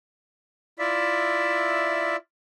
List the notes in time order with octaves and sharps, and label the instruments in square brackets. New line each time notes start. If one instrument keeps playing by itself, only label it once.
[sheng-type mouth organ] E4 F4 D5 E5